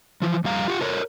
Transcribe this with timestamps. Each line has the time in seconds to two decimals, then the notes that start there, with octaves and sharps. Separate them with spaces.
0.22 E3 F3
0.44 F2 G3 F5 A#5
0.68 F4 G4 F#5
0.81 A4 A#4 C#5